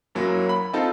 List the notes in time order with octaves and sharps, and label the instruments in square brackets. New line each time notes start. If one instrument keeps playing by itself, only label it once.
[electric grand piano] F#2 F#3 A#3 E4
B5
C4 D#4 F4 A4